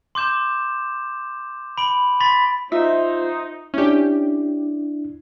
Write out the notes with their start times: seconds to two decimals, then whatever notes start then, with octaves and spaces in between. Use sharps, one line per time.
0.15 C6 D6 G6 E7
1.78 B5 D7 F#7
2.20 B5 C6 A6 B6
2.72 D#4 F4 C5 E5
3.74 C#4 D4 E4 G4